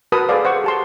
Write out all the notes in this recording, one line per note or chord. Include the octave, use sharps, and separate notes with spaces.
F#4 A#4 B4 A5 D#6
G#4 A4 B4 C5 D5 F5
C5 F#5 C#6
G4 A5 C6